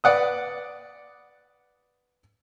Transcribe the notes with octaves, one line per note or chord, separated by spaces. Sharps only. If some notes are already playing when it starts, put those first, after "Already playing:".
B4 D5 F#5 D#6